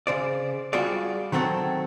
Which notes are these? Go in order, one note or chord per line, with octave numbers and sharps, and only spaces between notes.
C#3 C5 D5
G3 F4 F#4 G#4 D5
D#3 F#3 C4 C#4 A4 C#5